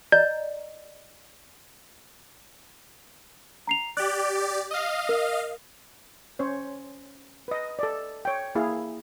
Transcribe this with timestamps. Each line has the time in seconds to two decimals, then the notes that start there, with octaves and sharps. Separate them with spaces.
0.12 D5 D#5 A#5 G6
3.67 A#5 C7 F7
3.97 G4 D5 F#6
4.71 D#5 F5
5.09 A#4
6.39 C#4 C5 C#5
7.48 B4 D#5
7.79 A4 D5
8.25 C#5 G5
8.55 A#3 E4 G#4 F5